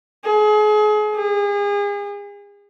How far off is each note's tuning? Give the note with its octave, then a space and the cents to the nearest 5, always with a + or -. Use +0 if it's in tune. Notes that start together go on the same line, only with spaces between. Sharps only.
G#4 +35
G#4 -35